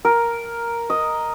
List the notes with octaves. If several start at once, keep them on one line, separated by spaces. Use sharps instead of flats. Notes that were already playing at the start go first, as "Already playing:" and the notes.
A#4
D#5